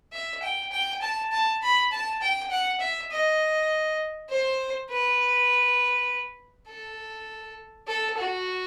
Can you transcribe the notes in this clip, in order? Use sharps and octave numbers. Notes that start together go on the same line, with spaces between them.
E5
G5
G5
A5
A5
B5
A5
G5
F#5
E5
D#5
C5
B4
A4
A4
F#4